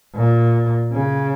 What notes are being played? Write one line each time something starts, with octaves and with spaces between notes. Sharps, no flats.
A#2
C#3